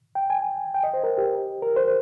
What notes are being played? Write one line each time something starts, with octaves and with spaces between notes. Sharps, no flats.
G5
G#5
G5
D#5
C5
A#4
G4
A#4
C5